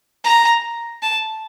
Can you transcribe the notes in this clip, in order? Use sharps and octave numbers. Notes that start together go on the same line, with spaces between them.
A#5
A5